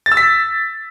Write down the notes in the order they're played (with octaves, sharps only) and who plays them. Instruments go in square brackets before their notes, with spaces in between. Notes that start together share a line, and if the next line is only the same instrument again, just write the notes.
[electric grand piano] A6
E6
B6